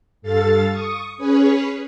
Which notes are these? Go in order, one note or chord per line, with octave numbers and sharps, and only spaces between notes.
G2 A4 F5 A6
C#6 D#6
C#4 G#4 B4 C#5